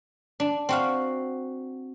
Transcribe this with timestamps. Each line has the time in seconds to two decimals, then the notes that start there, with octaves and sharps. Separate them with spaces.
0.40 D4
0.69 C4 F#4 F5